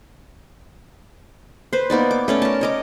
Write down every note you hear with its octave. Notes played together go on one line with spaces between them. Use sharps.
B4 C5
A#3 B3 D#4 D5
D6
A3 C#4 D5
A#4 A5
C#5 D#5 D6